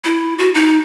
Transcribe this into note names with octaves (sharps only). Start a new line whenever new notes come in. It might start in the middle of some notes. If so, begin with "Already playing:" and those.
E4
F#4
D#4